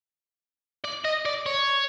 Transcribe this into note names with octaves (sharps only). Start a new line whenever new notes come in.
D5
D#5
D5
C#5